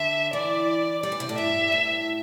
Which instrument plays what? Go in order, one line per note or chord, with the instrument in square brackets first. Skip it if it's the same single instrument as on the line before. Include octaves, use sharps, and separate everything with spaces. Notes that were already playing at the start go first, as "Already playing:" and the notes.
Already playing: [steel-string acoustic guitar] D3 [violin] E5
[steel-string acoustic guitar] E3 [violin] D5
[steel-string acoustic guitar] G3 [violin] D5
[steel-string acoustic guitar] E3
C3
A2
[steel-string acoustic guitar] G2 [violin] E5
[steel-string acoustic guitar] A2